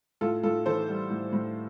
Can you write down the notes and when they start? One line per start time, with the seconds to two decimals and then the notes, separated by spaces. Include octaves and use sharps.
0.21 A2 F4 A4
0.43 A2 F4 A4
0.66 E3 A4 C5
0.88 G3
1.10 A2
1.33 A2